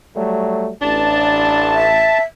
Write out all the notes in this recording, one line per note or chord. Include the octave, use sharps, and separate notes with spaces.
F#3 G3 A3
A1 D4 A5
E5